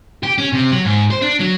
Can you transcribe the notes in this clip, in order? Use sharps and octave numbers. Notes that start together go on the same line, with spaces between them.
G4
C#4
C3
F#3
G#2
C5
D4
F#3